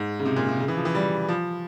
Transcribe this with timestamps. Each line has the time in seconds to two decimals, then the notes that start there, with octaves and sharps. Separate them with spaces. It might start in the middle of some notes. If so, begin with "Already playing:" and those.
Already playing: G#2
0.19 C#3
0.25 C3
0.36 A#2
0.49 C3
0.60 C#3
0.68 E3
0.77 F3
0.85 E3
0.95 G3
1.28 F3